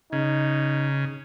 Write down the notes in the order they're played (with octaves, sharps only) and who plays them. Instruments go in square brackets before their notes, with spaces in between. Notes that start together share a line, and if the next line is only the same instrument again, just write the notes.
[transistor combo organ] C#3 [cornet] D#4